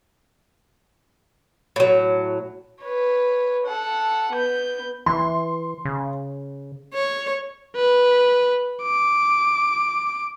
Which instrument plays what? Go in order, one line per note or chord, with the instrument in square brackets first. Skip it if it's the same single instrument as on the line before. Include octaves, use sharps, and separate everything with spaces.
[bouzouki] A2 F#3
[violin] B4 C#5
A4 F#5
B3 G6
[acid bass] E3 [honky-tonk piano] C6
[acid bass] C#3
[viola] C#5
[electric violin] B4
D6